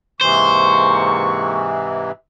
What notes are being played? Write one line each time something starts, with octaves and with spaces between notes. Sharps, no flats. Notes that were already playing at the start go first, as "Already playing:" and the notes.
G#2 C3 E3 A#3 C5 C#6